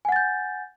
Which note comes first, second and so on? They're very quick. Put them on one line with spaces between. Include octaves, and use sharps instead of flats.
G#5 F#5 A6 G6